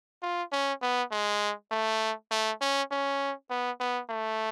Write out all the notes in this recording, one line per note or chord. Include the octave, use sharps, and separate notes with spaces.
F4
C#4
B3
G#3
A3
A3
C#4
C#4
B3
B3
A3